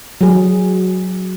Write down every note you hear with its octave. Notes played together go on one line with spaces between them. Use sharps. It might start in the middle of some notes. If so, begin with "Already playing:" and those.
F#3 G#4